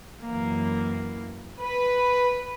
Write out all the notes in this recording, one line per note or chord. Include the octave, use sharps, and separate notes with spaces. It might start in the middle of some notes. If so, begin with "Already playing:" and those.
F#2 E3 A#3
B4